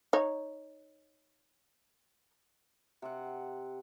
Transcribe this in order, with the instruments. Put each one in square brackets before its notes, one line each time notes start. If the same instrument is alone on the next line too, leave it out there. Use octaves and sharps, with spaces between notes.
[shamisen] D#4 C#5
[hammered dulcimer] C3 F#5